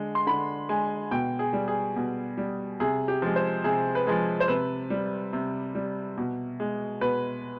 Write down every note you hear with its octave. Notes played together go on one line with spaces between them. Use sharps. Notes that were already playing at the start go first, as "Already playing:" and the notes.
Already playing: D3 G#3
C6
D3 B5
G#3 G#5
B2 G5
G#4
G3
G#4
B2
G3
C3 G#4
G4
F3 G#3
C5
C3 G#4
B4
F3 G#3 G#4
C5
C3 B4
G3
C3
G3
B2
G#3
B2 B4